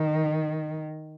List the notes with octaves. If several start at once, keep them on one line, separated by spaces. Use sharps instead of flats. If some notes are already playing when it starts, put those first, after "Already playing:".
Already playing: D#3